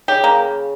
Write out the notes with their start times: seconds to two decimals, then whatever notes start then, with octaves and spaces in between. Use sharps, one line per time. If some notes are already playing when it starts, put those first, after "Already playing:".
0.08 C#3 G4
0.24 A#3